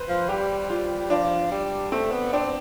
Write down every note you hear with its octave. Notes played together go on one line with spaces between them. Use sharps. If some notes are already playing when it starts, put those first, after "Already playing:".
Already playing: B4 C5
F3
G3 G4
G3 F4
F3 D4
G3
A3 C4
B3
C4 D4